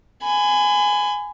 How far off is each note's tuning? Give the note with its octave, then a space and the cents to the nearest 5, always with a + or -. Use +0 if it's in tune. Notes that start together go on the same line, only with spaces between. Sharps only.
G#5 +0 B5 +35